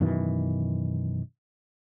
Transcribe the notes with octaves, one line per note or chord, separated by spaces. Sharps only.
F#2 B2 D#3 E3